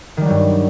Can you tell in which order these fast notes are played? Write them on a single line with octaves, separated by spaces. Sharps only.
D#3 G3 F#3 G2